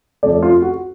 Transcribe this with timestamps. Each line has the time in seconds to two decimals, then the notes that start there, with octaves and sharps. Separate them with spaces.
0.23 F2 F3 A3 D5
0.43 F4
0.62 F#4